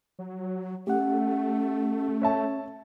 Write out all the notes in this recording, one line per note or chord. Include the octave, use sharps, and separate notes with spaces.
F#3
A3 C#4 G4 F#5
C#5 E5 A5